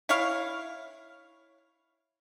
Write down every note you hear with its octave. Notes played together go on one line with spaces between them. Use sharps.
E4 C#5 F5